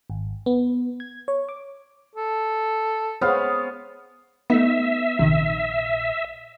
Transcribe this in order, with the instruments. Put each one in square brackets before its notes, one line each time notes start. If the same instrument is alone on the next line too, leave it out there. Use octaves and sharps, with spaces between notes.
[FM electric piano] G#1
B3
G#6
C#5
D6
[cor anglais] A4
[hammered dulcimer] B3 F5 [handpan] G#4 C5 C#5
[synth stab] A3 D#4 [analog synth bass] B3 [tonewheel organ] E5
[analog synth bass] A#1 [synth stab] C3 D#3